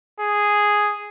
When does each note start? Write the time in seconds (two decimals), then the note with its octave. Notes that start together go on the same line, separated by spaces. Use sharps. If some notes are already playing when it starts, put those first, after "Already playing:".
0.20 G#4